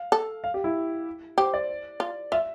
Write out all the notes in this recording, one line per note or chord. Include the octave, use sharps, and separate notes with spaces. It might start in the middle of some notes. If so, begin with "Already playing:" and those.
Already playing: F5
A4
F5
G4
E4
G4 C5
D5
F4
F4 E5